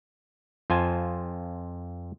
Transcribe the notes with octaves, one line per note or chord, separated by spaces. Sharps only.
F2 F4 C5 G#5 A5